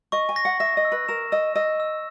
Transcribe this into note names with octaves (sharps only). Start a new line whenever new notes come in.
D#5 C#6
G#5
A#6
F#5
E5 A#6
D#5
E6
B4
A#4 E7
D#5 E6
D#5 E6
E6